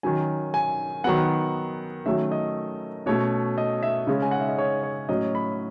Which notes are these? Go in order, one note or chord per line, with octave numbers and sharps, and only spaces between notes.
D#3 F#3 C#4 G#5
G#5
D#3 F#3 B3 F#5
D#3 F#3 A3 C#4 E5
D#5
B2 A3 C#4 C#5
D#5
E5
C#3 G#3 C#4
G#5
F#5
E5
D#5
C#5
C#5
A2 F#3 C#4 D#5
B5